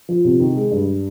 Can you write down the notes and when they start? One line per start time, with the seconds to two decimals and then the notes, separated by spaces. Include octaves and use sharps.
0.09 F3
0.25 C3
0.40 D#3
0.56 G#3
0.71 G2